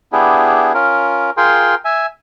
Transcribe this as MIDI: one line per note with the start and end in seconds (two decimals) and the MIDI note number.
0.12 0.73 59
0.12 0.73 62
0.12 0.73 64
0.12 0.73 67
0.12 0.73 68
0.74 1.30 61
0.74 1.30 65
0.74 1.30 70
1.37 1.75 65
1.37 1.75 68
1.37 1.75 70
1.37 1.75 79
1.37 1.75 84
1.85 2.06 76
1.85 2.06 80